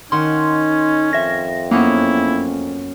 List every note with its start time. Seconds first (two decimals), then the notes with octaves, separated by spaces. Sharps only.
0.12 D#3 C#4 D#4 F#5 C6
1.13 F2 E5 A#6
1.71 F#2 A#3 B3 C#4 E4 C#5